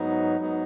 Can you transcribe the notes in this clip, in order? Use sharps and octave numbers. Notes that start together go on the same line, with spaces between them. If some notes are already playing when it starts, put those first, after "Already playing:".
Already playing: G#2 F#3 B3 D#4
G#2 F#3 B3 D#4